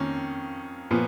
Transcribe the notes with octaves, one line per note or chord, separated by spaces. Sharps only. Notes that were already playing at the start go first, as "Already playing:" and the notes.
Already playing: F2 D#3 A#3 C#4
A#2 F3 B3